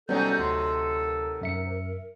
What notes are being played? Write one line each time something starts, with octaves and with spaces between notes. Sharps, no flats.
C3 F#3 G3 B3 C#4 D#4 A4 G6
D2 C6
A#4
F#2 E5 C#7